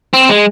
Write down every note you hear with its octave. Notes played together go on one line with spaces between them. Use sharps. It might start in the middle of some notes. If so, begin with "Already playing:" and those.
C4
G#3